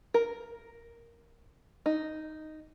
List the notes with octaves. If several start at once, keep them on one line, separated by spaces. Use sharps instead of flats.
A#4
D#4